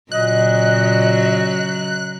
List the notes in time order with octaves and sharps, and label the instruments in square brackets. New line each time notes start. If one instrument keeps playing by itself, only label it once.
[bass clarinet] A#2 [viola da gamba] C#3 F#3 [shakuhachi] D#5 [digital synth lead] F#6